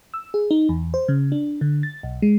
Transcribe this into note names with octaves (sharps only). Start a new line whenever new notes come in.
E6
G#4
D#4
E2
C5
C#3
D4
D3
A6
B1
G#3